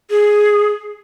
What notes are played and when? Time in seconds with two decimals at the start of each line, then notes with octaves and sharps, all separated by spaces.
0.10 G#4